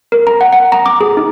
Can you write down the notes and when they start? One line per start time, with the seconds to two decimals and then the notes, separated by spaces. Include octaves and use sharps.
0.12 A#4
0.27 A#5
0.41 F#5
0.53 F#5
0.72 A#5
0.86 D6
1.01 G#4
1.17 D#4